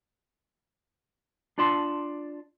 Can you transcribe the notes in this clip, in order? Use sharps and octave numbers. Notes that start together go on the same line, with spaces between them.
D4 F4 D5 A5 C6